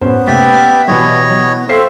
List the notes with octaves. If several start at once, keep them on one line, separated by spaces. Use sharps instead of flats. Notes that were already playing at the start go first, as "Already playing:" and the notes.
F#2 A2 B3 C#4 C5
C3 A3 A#3 G4 D5 E5
F6 B6
B2 E3 G3 C#5 D#5
F#3 B3
C4 A4 C5 E5 F5 C7